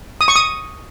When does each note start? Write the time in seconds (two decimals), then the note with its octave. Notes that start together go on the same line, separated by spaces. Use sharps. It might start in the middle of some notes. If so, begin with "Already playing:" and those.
0.21 D#6
0.28 C#6
0.36 D#6